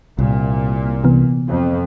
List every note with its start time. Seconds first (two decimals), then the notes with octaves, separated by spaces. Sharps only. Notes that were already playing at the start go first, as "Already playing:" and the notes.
0.18 C2 A#2
1.04 C3 E3 B3
1.48 F2